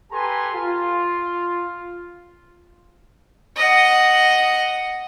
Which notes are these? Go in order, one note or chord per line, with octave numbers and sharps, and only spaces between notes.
G4 A4 B4 G#5 A#5 C6
F4
D#5 F#5